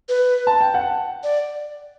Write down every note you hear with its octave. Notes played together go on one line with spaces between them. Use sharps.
B4
A5
G5
F#5
D5